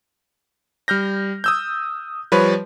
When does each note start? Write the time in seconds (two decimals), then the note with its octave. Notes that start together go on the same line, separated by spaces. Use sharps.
0.88 G3 F6 G6 A#6
1.44 D#6 E6 G6
2.32 F3 G3 B4 C#5